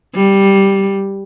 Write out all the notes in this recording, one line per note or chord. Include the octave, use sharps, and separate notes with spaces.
G3